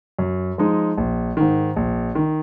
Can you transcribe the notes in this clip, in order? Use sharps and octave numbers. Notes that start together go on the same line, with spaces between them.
F#2
F3 G#3 D#4
A#1
G#2 D#3
A#1
D#3